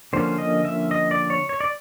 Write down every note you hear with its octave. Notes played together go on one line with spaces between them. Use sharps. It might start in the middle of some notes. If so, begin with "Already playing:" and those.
D3 F3 A#3 C#4 C5
D#5
E5
D#5
D5
C#5
C#5
D5